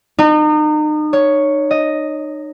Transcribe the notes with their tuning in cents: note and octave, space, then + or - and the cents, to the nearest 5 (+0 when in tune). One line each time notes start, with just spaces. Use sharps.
D#4 -35
C#5 +5
D#5 +0